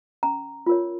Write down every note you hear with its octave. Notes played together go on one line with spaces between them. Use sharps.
C#4 A#5
F4 A#4 C#5